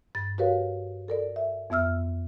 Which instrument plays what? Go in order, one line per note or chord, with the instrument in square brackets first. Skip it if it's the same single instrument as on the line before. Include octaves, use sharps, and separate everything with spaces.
[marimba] G2 A6
F#4 G4 A#4 B4 C#5 F5
A4 A#4 D5
E5
F2 B3 E5 E6 F6